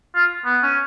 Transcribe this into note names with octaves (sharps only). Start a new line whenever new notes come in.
F4
B3
C#4